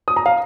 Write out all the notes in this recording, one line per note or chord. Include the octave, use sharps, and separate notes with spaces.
D#6
A#5
F5